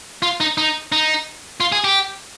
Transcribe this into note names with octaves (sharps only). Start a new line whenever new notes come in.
F4
D#4
D#4
D#4
F4
G#4
G4